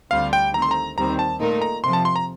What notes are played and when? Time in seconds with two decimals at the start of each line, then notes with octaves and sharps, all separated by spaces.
0.11 D2 D3 G3 C4 F4 F5
0.33 G5
0.54 D#3 A3 C4 A#5
0.62 C6
0.71 A#5
0.97 D#2 D#3 G3 C4 A#5
1.19 A5
1.40 A#2 A3 D#4 A#4
1.62 A#5
1.84 F2 C3 F3 C6
1.93 A5
2.05 C6
2.16 A#5